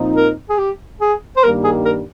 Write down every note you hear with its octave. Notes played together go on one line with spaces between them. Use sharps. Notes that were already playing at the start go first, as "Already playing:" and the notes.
Already playing: A#2 F3 C4 D#4
A#4
G#4
G4
G#4
C5
G2 D#3 G3 A#3 A#4
G#4
A#4